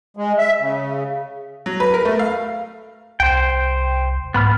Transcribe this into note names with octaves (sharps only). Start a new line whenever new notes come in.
G#3
E5
C#3
F#3
B4
A#4
A3
F5
C2 C5 G5
G#2 B3 B5 F6